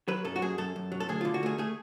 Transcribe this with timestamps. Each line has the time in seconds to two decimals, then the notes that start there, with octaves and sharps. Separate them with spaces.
0.08 F#3 B4
0.25 F#2 A4
0.36 F#4
0.42 F#2 G#4
0.58 F#2 A4
0.76 F#2
0.92 F#3
1.00 A4
1.09 D2 G#4
1.21 D3 F4
1.34 F#4
1.43 A3 G#4
1.58 A3 G#4